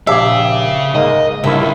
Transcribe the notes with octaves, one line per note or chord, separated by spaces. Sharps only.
A#1 C#3 G4 E5 F5 G#5
G#2 A#3 D#5
C#2 G2 A#3 E4 E5